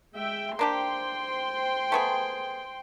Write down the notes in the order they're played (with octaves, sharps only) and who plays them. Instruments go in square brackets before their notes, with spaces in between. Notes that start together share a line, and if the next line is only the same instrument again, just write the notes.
[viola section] G#3 E5 G5
[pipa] A#3 D4 G4 [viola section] C5 G5 C6
[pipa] A3 B3 G#4